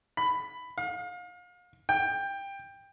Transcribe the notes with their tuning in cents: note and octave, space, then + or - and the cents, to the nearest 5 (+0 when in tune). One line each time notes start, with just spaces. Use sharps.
B5 +10
F5 +35
G5 +15